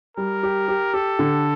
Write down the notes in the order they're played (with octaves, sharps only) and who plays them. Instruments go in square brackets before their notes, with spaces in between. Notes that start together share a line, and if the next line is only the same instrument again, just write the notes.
[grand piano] G3 [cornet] A#4
[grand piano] G4
G4
[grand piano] G4 [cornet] A4
[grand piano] D3